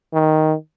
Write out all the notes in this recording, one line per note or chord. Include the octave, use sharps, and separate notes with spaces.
D#3